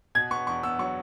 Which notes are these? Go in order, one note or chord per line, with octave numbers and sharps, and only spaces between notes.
B2 G#6
B3 C#6
E2 C#6
B3 E6
F#3 C#6